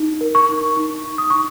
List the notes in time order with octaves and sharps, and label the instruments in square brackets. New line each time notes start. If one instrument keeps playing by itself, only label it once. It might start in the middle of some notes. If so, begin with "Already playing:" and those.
Already playing: [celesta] D#4
A#4
C#6
D#4
D#4 C#6
D#4
D#6
D#4 C#6